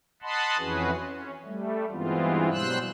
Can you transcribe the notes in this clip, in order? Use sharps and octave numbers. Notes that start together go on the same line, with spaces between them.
D#5 F#5 A5 B5 C6
F2 E3 C#4 F#4 G#4 B4
C#4
G3 A3
G2 E3 G#3 B3 C4 F4
B2 F#3 G3 C5 E6 F#6